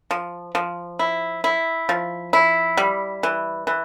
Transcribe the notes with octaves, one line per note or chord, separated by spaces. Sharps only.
F3
F3
E4
E4
F3
E4
G3
E3
E3